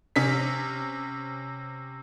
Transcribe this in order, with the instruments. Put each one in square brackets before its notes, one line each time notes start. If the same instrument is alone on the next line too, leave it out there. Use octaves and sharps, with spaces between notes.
[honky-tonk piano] C3 C#4 B6